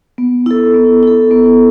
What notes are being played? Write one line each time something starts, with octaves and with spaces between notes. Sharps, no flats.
B3
E4 A4
B3
E4 A4
B3